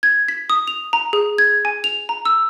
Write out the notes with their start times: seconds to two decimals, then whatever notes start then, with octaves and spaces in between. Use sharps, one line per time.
0.03 G#6
0.28 B6
0.50 D#6
0.68 F7
0.93 A#5
1.13 G#4
1.38 G#6
1.65 G#5
1.84 F7
2.09 A#5
2.25 E6